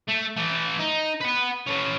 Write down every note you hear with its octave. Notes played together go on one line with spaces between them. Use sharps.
A3
E3 A3
D#4
B4 F#5
A3 C#4